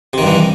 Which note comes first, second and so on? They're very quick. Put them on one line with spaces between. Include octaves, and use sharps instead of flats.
C3 D#3 G2 E3